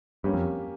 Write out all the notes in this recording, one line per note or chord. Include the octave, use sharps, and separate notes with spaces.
G2 A#3 C#4 G4
F2